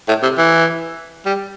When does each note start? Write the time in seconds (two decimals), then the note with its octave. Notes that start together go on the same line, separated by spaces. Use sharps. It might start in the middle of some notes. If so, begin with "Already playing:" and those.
0.08 A2
0.23 C3
0.38 E3
1.26 G3